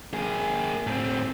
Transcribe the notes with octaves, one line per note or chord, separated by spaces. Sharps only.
A#3 G#4
A2 C4